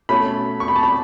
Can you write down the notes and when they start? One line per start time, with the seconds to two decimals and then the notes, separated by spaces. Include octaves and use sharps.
0.09 B2 A3 C#4 B5
0.60 C#6
0.68 B5
0.76 A5
0.83 B5